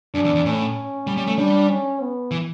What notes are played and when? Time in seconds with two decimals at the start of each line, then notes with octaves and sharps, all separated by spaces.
0.14 F#2 D4
0.25 E2
0.35 E2
0.45 A2 C#4
1.07 G3
1.18 G3
1.28 A3
1.38 G3 D4
1.69 C#4
2.01 B3
2.31 E3